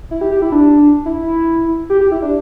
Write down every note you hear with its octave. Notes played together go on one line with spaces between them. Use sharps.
E4
G4
G4
E4
D4
E4
G4
G4
E4
D4